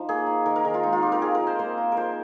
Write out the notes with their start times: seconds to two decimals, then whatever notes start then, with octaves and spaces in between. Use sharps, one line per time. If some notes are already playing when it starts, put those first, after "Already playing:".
Already playing: F3 D#4
0.09 A#3 G#4
0.27 D#4
0.46 D#3 A#4
0.56 A#4
0.65 D#3 G#4
0.74 F4
0.83 G#3 D#4
0.93 F4
1.02 C4 G4
1.12 A#4
1.21 F3 G#4
1.35 A#4
1.41 F3
1.47 C5
1.59 A#3 C5
1.78 D#4
1.92 A#4
1.97 F3 C5